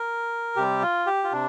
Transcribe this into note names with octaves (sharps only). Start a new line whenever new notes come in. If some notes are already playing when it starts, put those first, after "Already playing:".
Already playing: A#4
C3 G3 G4
F4
G4
F4
C3 D4